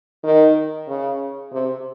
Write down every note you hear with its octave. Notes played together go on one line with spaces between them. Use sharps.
D#3
C#3
C3